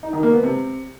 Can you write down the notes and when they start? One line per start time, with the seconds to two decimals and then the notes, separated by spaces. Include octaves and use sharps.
0.03 D#4
0.13 D#3
0.23 A#3
0.33 B3
0.43 C3